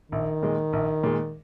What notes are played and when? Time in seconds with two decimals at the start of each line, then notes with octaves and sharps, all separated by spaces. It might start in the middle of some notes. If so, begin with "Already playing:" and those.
0.12 A#1 D#3
0.43 A#2 G#3
0.73 A#1
1.04 A#2 G#3